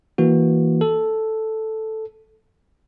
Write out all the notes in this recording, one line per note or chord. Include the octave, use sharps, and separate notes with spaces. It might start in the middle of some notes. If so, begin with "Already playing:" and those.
E3 A#3 F#4
A4